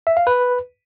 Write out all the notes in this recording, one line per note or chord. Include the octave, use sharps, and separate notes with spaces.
E5
F5
B4